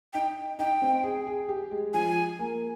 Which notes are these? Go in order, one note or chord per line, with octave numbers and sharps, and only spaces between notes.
D#4 G5
D#4 G5
C4
G#4
G#4
G4
G#3
F3 G#5
A#3